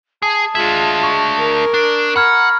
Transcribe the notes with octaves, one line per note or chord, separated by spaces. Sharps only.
G#4 A5 D#6
G#3 D4 F4 E5 G#6 F#7
C#6
A#4
D4
F#5 A#5 B5 F6 G#6